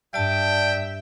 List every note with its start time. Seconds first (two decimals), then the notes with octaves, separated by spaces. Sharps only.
0.14 G2 D5 E5 G5 A5